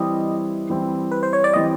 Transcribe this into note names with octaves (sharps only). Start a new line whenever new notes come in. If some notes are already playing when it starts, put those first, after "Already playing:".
Already playing: E3 G3 C4 E4 D#5
E3 G3 C4 E4
B4
C5
C#5
D5
E3 G3 C4 E4 D#5